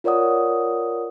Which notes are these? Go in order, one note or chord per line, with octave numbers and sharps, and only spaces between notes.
F4 A#4 C#5 D5 F#5 D#6